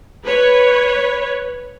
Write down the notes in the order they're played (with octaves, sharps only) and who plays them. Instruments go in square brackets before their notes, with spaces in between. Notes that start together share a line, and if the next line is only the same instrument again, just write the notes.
[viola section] B4 C#5